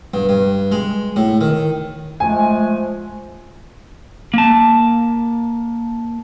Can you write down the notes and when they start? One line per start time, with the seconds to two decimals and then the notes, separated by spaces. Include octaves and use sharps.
0.14 G2
0.29 G2
0.72 G#3
1.16 A2
1.41 D#3
2.20 F3 G#3 A3 G#5
4.34 A#3 A5